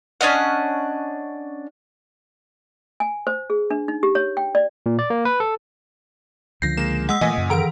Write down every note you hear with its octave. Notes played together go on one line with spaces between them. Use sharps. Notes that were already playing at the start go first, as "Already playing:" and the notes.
C#4 D4 D#5 F#5
G#5
C5
G#4
D4
D#4
G4
C#5
G5
D5
A#2
D5
A#3
B4
A4
C#2 D3 F3 G6 A#6 C7
G#3 A#3 E7
G#3 F#5 D#6 E6
A#2 E3 F#3 A3 D#5 G#5 B6
F#2 C#3
D#3 E3 A#4 A#5 D7